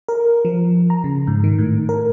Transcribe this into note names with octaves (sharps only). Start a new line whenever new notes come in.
A#4
F3
A#5
C#3
G#2
D#3
A2
A#4